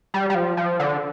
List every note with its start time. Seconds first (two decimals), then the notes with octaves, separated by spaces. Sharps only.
0.14 G3
0.30 G3
0.35 F3
0.57 F3
0.79 D3